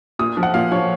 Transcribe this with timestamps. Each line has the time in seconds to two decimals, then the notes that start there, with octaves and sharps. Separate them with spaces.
0.19 A#2 D#6
0.37 F3
0.43 F#5
0.54 A#2 F5
0.72 F3 C#5